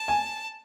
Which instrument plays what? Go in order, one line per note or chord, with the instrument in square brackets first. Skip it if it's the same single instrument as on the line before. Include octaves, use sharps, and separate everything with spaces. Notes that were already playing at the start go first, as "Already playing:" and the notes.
Already playing: [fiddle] A5
[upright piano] G#5